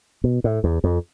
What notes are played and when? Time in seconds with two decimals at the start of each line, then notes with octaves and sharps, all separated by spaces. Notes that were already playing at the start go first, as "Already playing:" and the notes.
0.24 B2
0.44 A2
0.64 E2
0.84 F2